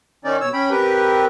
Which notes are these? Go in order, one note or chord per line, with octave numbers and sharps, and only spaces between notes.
D#3 C#4 D#4 D5
B2 C#5 E6
C#4 G5 B5
C4 G4 A#4 B4